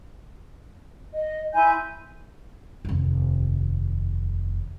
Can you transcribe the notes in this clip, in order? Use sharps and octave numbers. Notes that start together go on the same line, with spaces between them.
D#5
E4 G#5 C6 G6
F1 D#2